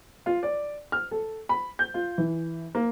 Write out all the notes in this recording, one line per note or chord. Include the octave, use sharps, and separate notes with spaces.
F4
D5
F6
A4
B5
G6
F4
E3
A#3